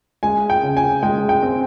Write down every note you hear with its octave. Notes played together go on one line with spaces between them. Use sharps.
G#3 G#5
G5
C#3
G#5
G#3 G5
G5
C4